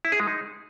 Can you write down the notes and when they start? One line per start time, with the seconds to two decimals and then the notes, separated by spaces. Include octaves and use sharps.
0.05 E4
0.12 G#4
0.20 G#3
0.27 D#4